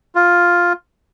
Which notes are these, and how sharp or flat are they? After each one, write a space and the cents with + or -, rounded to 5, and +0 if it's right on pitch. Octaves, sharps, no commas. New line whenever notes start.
F4 +5